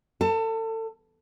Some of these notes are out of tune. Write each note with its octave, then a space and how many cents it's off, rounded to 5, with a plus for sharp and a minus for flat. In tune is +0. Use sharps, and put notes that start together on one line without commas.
A4 +30 A5 +0